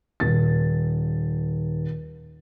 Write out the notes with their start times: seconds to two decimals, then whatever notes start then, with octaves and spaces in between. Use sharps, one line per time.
0.20 D#1 A6